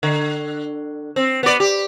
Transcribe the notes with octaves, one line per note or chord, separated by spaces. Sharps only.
D3
C4
B3 D5
G4